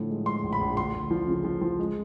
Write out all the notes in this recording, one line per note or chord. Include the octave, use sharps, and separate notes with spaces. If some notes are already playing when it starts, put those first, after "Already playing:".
Already playing: A2 D3 F3
G#3
G#3 C6
A#1
B5
A#1
D2 C6
D2
F3
C#3
F3
F3
G#3